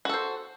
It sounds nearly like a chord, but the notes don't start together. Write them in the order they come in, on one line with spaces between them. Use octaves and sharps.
F#4 A4 C5